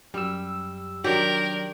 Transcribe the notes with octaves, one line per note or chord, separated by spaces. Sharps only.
F#2 G3 E6
D#3 F#3 D4 G4 A#4